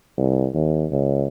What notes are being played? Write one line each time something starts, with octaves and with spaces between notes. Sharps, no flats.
C2
D#2
C#2